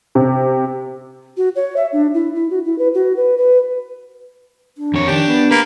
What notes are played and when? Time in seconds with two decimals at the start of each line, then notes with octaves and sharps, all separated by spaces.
0.15 C3
1.37 F#4
1.55 C#5
1.76 E5
1.92 D4
2.14 E4
2.35 E4
2.50 F#4
2.65 E4
2.78 B4
2.94 F#4
3.16 B4
3.38 B4
4.78 D4
4.94 F2 C#5
5.08 D#3 D4 G4
5.27 B3
5.51 A#3 B4